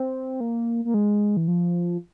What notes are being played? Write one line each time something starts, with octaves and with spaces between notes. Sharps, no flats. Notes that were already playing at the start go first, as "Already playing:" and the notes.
Already playing: C4
A#3
A#3
G#3
E3
F3